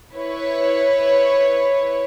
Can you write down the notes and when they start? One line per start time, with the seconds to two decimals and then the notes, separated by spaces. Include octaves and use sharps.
0.15 E4 B4 C#5